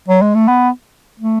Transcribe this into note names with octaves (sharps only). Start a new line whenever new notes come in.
F#3
G#3
A3
B3
A3